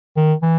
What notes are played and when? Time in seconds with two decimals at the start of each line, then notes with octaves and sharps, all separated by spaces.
0.16 D#3
0.42 E3